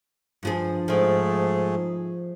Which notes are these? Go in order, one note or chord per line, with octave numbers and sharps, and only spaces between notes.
G2 F3 G#4
G#2 F3 A3 C4 G#4